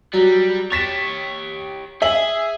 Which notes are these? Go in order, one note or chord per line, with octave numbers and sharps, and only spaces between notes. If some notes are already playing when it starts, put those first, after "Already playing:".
F#3 G3
G4 C#5 A6 B6 E7
G#4 E5 G#5 F#7